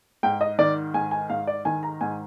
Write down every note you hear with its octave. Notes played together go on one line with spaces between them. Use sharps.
G#2 G5
D#5
D#3 D5
G#2 G#5
G#5
G#2 F5
D5
D#3 G#5
A#5
G#2 G#5